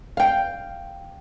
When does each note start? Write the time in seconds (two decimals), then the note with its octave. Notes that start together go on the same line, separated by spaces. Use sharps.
0.17 F5 G5